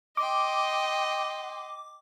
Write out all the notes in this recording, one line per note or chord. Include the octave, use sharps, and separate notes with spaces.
D#5 G5 C6 D6